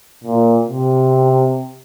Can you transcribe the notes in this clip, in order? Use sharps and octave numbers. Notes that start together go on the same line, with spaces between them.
A#2
C3